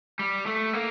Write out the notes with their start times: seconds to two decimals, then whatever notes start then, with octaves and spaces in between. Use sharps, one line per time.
0.19 G3
0.47 A3
0.74 A#3